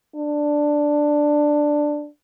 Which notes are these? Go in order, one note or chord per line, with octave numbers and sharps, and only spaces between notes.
D4